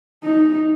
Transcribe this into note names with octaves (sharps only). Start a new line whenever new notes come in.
D#4